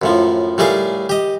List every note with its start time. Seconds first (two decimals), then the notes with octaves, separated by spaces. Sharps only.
0.02 F#2 A2 F3
0.58 A2 G3 A3 G#4 A#4 F5
1.09 G4 D#5